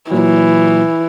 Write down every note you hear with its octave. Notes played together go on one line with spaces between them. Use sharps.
A#2 E3 F#3